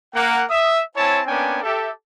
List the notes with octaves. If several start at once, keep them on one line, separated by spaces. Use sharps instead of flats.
A#3 F#5
E5 D#6
C4 E4 C#5 G#5 A5
A#3 B3 C#4 D4 G5 G#5
G4 A4 E5